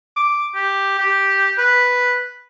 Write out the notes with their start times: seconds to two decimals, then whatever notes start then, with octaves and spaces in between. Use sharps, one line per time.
0.16 D6
0.55 G4
0.99 G4
1.58 B4